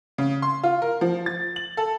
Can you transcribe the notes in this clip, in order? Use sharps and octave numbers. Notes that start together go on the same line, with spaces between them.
C#3
C6
F4
A#4
F3
A6
F#7
A4